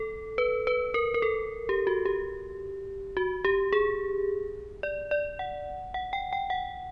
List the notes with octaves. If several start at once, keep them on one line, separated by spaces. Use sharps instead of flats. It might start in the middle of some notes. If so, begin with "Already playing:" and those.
Already playing: A4
B4
B4
A#4
A#4
A4
G4
F#4
G4
F#4
G4
G#4
D5
D5
F#5
F#5
G5
G5
F#5